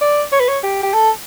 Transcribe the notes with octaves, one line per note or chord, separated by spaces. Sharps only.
D5
C#5
B4
C#5
G4
G4
A4